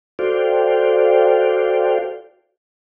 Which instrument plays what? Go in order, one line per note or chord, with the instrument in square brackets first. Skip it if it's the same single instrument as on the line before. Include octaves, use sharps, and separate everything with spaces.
[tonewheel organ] F#4 A4 C5 D5 F5 G5